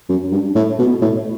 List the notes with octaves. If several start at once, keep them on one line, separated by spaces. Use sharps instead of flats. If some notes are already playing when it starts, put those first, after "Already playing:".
F#2
G2
A2
B2
A2